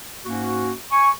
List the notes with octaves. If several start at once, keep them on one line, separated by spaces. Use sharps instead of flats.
G#2 A#3 C#4 F#4
G#5 C#6